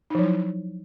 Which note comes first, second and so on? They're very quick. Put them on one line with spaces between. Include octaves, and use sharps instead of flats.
D#4 F3 F#3 E4